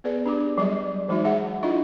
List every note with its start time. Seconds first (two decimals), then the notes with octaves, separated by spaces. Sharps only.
0.04 B3 G#4 B4 D5
0.25 D4 G4 D6
0.58 F#3 G3 G#4 D5 D#5
1.08 E3 F#3 G#3 D#4 F#4 E5
1.24 D#4 G#4 E5 F#5
1.63 D4 E4 F4 D#5